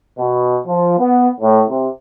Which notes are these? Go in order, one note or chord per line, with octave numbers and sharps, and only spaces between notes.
B2
F3
B3
A2
C3